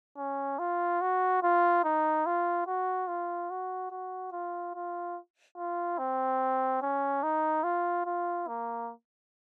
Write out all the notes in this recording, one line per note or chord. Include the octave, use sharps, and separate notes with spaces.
C#4
F4
F#4
F4
D#4
F4
F#4
F4
F#4
F#4
F4
F4
F4
C4
C#4
D#4
F4
F4
A#3